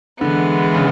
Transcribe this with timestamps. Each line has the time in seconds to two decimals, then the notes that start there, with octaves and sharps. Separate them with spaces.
0.20 D3 E3 G#3 B3
0.75 C#3